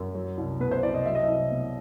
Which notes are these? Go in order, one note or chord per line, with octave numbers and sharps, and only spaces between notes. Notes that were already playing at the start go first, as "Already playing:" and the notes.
Already playing: F#2
F#3
C2
B2 B4
C5
C2 D5
D#5
F#3 E5
D#5
C2 E5
B2